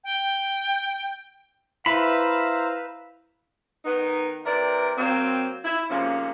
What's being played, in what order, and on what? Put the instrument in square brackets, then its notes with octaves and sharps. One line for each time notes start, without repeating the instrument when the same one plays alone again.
[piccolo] G5
[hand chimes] E4 [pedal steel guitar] B4 E5 B5 [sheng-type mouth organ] C5 A#5 E6 [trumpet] F5
[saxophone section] D#3 B3 D#4
C3 E3 A#4 D5
F#3 A#3 C4
E4
G#2 C3 F3 A#3 C#4